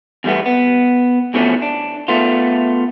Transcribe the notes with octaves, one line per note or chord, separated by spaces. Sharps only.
E2 G3 A3 B3
B3
E2 B2 E3 F3 A3 C#4
D4
A3 B3 F4